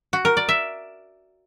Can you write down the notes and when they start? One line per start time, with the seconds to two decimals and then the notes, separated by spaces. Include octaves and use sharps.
0.13 F#4
0.25 A#4
0.37 D5
0.49 E5